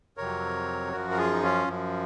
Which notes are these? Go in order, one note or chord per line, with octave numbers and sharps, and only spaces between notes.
F2 C3 F#3 A#4 C#5
F#2 F3 F#4 A#4
A#4
F4 G#4
D#4
C#4 F4
F#2 F3